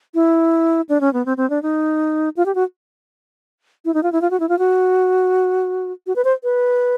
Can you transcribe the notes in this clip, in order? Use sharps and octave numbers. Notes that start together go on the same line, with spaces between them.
E4
D4
C#4
B3
C4
C4
D4
D#4
F4
G4
F#4
E4
D#4
F4
E4
F4
F#4
E4
F4
F#4
F#4
B4
C5
B4